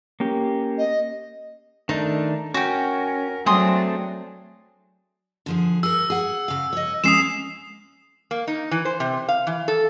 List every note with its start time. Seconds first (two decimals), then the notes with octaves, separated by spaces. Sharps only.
0.20 A#3 C#4 G4
0.78 D#5
1.89 D#3 A3 D4 D#4
2.54 C#4 F#4 A#4 G5
3.46 F#3 A3 C4 D4 G#4 C6 D#6
5.46 D3 F3 G#4
5.83 G#4 A#4 E6
6.10 G#4 F#5
6.48 C#3 F5
6.73 C#5 D#5
7.04 G#3 A#3 C#4 D#6 C7 E7
8.31 A#3
8.47 D#4
8.71 E3
8.85 C5
9.00 C3
9.28 F5
9.47 E3
9.68 A4